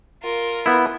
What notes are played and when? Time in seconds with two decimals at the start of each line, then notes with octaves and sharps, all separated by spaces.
0.23 F4 A#4
0.66 B3 E4